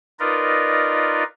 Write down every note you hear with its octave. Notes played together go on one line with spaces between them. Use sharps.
D#4 F4 A#4 B4 D5 D#5